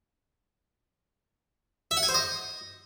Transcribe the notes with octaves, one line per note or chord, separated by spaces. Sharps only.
E5
F#5
G#5
C5
D#5